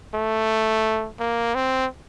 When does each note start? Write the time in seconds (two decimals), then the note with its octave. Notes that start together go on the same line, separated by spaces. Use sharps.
0.14 A3
1.20 A#3
1.55 C4